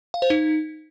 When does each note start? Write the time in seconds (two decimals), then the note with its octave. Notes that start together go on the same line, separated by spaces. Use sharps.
0.14 F5
0.22 C5
0.30 D#4